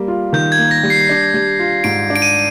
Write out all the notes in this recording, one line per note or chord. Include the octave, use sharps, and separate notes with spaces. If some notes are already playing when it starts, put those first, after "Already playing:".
Already playing: G3 A#3
F4
D#3 G6
G#6
A#3
A#6
G3
C7
D4
G3
F4
G#2 D7
D4
D7
D#7